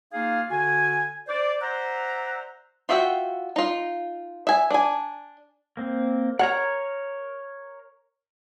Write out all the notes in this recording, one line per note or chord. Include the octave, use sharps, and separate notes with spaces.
A#3 D#4 F4 G#4 F5
D3 F#4 G#5
C5 D5
C5 D5 E5 F#5 A#5
F4 F#4 E5 F#5 G5
D#4 F4
E5 G#5
D4 G#5
A#3 C4
A#4 C#5 F#5 A#5